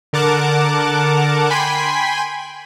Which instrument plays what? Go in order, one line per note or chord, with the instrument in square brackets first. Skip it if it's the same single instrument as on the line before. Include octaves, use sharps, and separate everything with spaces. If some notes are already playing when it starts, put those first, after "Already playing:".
[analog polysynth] D3 A#4 F#5 A5 D6
G5 G#5 B5 C6 B6